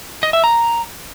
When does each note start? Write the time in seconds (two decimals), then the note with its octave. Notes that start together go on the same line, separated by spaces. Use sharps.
0.23 D#5
0.33 E5
0.44 A#5